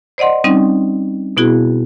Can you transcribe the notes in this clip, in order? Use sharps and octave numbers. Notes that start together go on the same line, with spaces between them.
C5 D5 D#5 F#5 C6
G3 C4 C#4 D#4
B2 B3 E4 F#4 G#4